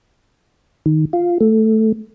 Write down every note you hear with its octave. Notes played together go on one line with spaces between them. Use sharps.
D#3
F4
A3